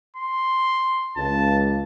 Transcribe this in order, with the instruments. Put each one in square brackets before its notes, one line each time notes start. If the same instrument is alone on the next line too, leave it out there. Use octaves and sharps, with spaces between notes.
[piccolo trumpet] C6
[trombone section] C#2 [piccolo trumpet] A5